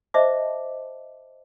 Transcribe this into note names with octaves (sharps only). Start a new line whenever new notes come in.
C5 D#5 E5 A5 D6